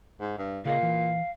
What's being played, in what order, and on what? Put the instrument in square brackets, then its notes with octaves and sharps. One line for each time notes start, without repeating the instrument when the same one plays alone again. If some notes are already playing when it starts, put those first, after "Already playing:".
[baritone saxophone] G#2
G2
[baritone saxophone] A#2 [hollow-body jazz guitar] C#3 G#4 D#5 [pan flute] F5
[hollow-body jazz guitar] E3